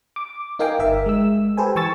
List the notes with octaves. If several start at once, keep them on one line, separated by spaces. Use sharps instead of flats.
D6
D#4 A#4 F5 G5 G#5 D6
G1 A#4 E5
G#3 E6
G4 A4 B4 C5 G#5
E3 G#5 C#6 E6 A6